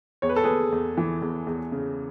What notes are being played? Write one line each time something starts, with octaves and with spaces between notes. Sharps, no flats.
E2 C#5
B4
A4
E2 G#4 B4
E2
E3
E2
E2
C#3